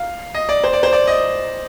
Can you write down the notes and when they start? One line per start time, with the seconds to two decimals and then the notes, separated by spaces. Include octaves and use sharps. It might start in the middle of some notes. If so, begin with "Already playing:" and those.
Already playing: F5
0.35 D#5
0.49 D5
0.64 C5
0.73 D5
0.83 C5
0.93 D5
1.07 D#5